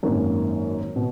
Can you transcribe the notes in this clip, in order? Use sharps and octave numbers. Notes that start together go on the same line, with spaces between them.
G#1 F#2 D#3 A#3
B2